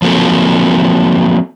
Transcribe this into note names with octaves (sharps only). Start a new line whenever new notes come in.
F3 F#3 A#3 C4 A4